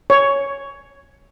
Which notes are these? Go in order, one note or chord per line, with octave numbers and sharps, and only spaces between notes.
C#5